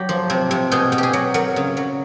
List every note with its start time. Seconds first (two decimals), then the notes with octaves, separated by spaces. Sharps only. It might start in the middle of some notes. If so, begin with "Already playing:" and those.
Already playing: F#3 G4
0.09 F3
0.30 C3
0.51 C3
0.71 B2 G#4
0.92 B2
0.98 G4 G#4
1.13 F#3
1.34 F#3 A#4
1.56 C#3
1.77 F#3